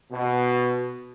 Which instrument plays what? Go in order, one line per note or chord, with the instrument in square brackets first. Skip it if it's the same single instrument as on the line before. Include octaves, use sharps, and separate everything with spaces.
[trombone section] B2